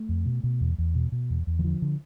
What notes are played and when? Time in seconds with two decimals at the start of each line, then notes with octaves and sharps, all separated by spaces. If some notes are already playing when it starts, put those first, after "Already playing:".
Already playing: A3
0.09 F2
0.26 B2
0.44 B2
0.61 E2
0.78 E2
0.95 B2
1.12 B2
1.30 E2
1.47 E2
1.59 E3
1.64 D3 F3
1.82 D3